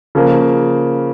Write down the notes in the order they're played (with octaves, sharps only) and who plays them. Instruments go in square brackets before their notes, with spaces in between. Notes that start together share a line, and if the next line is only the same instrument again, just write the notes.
[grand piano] C#3 F3 A#3